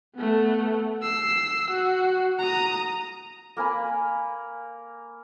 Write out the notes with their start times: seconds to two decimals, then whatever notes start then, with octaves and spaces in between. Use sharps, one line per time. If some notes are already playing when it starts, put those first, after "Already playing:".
0.15 A3 B3
1.03 E6 C7
1.71 F#4
2.40 A#5 D#6
3.57 A#3 A#4 G#5 B5